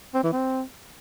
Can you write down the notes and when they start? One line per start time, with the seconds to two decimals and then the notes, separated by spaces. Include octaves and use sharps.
0.15 C4
0.24 E3
0.33 C4